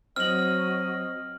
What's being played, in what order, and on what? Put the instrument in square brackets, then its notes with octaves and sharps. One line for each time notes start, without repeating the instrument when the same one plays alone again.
[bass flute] F#3 [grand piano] C4 [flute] D#5 [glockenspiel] F6 F#7